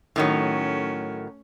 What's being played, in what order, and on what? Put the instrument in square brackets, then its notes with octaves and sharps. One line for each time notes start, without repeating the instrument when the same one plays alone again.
[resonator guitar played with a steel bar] A2 D#3 F#3 [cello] A3 C#4